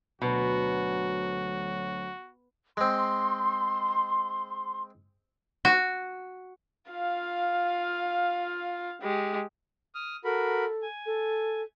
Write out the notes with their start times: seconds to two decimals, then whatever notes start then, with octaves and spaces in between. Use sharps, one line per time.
0.22 D2 B2 F#3 F#4 B4 A#5 B5
2.77 G#3 C4 C6
5.65 F#4
6.91 F4 F5
9.01 G#3 G4
9.95 D#6 F6
10.24 F#4 A4 A#4 B5
10.82 G#5
11.06 A4